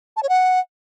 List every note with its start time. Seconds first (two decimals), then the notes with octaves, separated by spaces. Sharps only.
0.17 A5
0.23 C#5
0.29 F#5